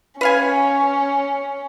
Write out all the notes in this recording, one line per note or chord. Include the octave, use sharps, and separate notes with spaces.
C#4 B4 F5 G#5